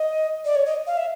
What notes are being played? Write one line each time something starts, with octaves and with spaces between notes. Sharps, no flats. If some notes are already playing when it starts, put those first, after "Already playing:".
Already playing: D#5
D5
C#5
D#5
F5
E5